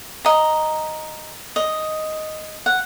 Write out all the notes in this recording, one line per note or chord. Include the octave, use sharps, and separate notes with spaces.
D#5 A#5
D#5
F#5